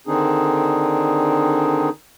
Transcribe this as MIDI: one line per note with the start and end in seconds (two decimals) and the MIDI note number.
0.07 1.89 50
0.07 1.89 51
0.07 1.89 60
0.07 1.89 62
0.07 1.89 63
0.07 1.89 68